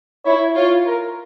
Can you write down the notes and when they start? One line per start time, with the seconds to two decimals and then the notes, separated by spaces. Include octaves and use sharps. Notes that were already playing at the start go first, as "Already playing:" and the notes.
0.25 E4 C#5
0.55 F4 C#5
0.87 A#4